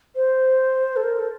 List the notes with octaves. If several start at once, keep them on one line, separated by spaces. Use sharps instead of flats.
C5
A4
A#4
A4